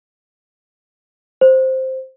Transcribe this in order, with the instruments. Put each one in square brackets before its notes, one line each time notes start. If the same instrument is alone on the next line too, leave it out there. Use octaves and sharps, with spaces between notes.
[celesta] C5